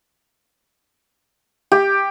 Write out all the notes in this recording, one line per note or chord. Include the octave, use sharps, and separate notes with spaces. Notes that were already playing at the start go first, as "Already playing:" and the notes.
G4